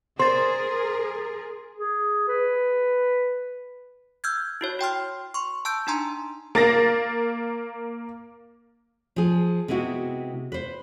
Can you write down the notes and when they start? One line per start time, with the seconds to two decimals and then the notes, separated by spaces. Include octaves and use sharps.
0.19 G#4 A#4 C5 C6 A6
1.77 G#4
2.28 B4
4.24 E6 F6 G6 G#6
4.61 E4 F#4 C#5
4.79 F#4 G5 C6 F6
5.34 C6 C#6
5.65 A5 E6 G6 D7
5.87 D4 D#4 G#5 A#5 C6
6.55 A#3 A6 A#6
9.16 F3 G#4
9.68 C3 G#3 B3 E4 F#4
10.52 B4 C5